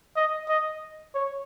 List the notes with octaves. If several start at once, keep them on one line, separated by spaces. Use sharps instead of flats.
D#5
D#5
C#5